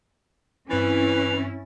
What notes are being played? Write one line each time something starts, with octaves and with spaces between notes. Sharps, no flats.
G2 E3 C4 C#4 E4 B4 A6